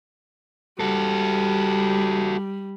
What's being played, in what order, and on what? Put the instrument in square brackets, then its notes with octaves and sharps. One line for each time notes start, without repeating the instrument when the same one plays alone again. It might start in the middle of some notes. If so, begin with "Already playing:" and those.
[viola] G3 [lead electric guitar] F#4 A4